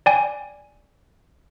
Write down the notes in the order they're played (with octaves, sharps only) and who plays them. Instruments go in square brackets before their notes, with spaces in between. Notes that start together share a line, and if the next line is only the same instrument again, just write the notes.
[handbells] D5 G5 G#5